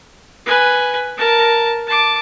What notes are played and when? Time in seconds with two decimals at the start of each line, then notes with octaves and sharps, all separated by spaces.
0.46 B4 G#5
1.18 A#4 A5
1.87 A5 D6